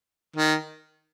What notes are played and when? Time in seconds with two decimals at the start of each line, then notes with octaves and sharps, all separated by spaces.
0.37 D#3